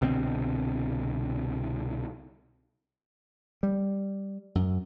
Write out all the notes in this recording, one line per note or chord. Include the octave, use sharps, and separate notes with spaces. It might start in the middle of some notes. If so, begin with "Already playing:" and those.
C2 B2 D3 C4
G3
F#2